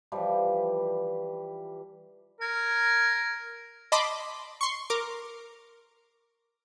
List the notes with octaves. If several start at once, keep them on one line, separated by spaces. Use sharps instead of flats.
E3 F3 G3
A#4 G#6
D#5 A5 B5 C6 D6
C6 C#6
A#4 D6